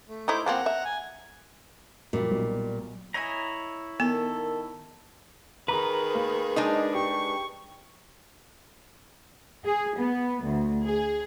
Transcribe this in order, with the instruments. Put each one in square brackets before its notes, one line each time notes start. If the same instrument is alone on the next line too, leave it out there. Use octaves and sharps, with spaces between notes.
[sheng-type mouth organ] A3
[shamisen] A3 D#4 E4 [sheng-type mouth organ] C5 D6
[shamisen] F3 A#3 C4 [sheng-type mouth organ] F#5 A#5
[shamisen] E5
[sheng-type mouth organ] G#5
[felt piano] F#2 F3 [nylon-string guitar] A#2 G3
[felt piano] B1
[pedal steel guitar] E4 C#5 A#5 [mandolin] D#5 G#5
[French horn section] D#3 A#4 [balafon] B3 [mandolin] A4
[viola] D#3 G#4 [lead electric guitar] B4 [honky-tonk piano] A#5
[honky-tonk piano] A#3
[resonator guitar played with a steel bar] G#3 D4 D#4
[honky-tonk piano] G4 [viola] C#6
[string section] G#4
B3
D2
G#4